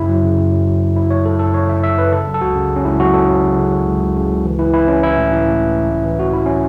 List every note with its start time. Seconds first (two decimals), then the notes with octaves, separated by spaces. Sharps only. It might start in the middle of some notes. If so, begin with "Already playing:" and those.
Already playing: F#2 C#3 E4
0.09 F#3
0.23 C#3
0.38 F#2
0.53 F#3
0.67 F#3
0.82 F#2
0.96 F#3 E4
1.10 C#3 C#5
1.25 F#3 A4
1.39 F#2 A4
1.54 C#3 C#5
1.69 C#3 E5
1.83 C#3 E5
1.98 F#2 B4
2.13 C#3 A4
2.27 F#3
2.34 A4
2.41 C#2 F#4
2.56 C#3
2.70 C#2
2.76 C#4
2.85 C#2 E4
3.00 F#3 F#4
3.14 F#3 A4
3.29 F#3
3.43 C#3
3.58 C#3
3.73 F#3
3.86 C#2
4.01 C#2
4.16 C#3
4.30 C#2
4.45 E3
4.59 E3 E4
4.73 E3 E4
4.88 E3 C#4
5.03 E3 E4
5.17 A2
5.32 E3
5.47 A2
5.61 A2
5.75 E3
5.90 A2
6.05 E3
6.19 A2 F#4
6.33 E3 E4
6.46 E3 C#4